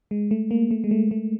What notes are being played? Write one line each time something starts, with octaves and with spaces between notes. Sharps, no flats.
G#3
A3
A#3
A3
G#3
A3
A3